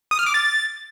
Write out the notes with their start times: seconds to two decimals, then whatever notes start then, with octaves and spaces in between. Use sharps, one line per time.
0.11 D#6
0.19 F6
0.27 D6
0.34 A6